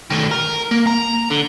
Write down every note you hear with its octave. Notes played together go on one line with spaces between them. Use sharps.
D#3 A3
A#4
A#3
A#5
D3